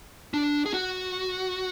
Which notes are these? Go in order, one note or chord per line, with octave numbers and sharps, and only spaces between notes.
D4
G#4
F#4